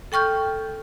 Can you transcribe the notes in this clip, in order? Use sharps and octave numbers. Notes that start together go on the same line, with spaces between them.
A4 G5 C#6 F6 G6